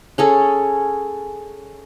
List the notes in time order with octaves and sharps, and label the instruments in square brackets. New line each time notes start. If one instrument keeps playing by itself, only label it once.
[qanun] C#4 G#4 A4